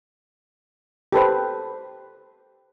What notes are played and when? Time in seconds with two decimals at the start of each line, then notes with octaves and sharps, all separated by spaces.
1.12 G4 A4 B4 C5